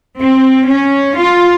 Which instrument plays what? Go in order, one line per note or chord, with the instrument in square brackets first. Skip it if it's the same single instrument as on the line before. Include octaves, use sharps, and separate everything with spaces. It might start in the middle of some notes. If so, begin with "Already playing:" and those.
[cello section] C4
C#4
F4